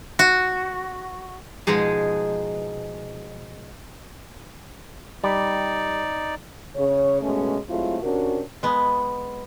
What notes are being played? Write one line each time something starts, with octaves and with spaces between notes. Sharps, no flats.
F#4
B2 F3 G#3 D#4 G#4
G3 D#4 D5
C#3 C#5
G2 B2 G#3 A3 C#4
F#3 G#3 A3 C4 E4 F4
C3 C#4 D4 F#4 A#4
G#3 B3